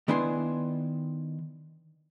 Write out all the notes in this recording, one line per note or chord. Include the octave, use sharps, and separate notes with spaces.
D#3 B3 D4 E4 G#5 C6